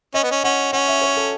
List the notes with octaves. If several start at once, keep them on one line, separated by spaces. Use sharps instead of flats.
C#4 D#5
B3
C#4
C#4 F#5
C#4 F#5
E5
C#5
A4